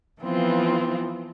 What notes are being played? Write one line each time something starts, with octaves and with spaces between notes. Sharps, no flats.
E3 F3 B3 C4 F4